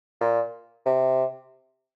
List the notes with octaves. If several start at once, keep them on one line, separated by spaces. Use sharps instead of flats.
A#2
C3